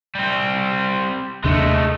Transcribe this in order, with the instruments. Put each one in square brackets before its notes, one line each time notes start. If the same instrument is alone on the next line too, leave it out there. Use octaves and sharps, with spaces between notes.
[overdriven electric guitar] G3 C4
[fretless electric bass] D#2 C3 D4 [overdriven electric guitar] G#3 A3